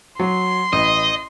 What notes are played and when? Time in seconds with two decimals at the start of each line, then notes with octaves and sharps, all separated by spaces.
0.19 F#3 C6
0.73 A1 D#5